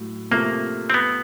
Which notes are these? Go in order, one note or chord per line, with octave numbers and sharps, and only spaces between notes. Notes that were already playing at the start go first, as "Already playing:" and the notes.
Already playing: A2 F#3
C3 F3 A3 A#3
C4
B3